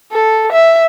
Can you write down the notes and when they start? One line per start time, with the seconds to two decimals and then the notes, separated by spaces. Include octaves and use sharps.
0.12 A4
0.53 E5